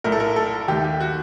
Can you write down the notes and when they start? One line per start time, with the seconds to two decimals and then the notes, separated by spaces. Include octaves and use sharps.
0.04 A#1 A2 A3 A#4
0.12 A4
0.20 A#4
0.36 A4
0.68 D#2 D#3 A3 G4
0.84 G4
1.00 F#4